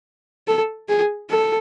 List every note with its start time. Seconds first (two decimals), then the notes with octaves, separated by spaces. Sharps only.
0.47 A4
0.88 G#4
1.30 A4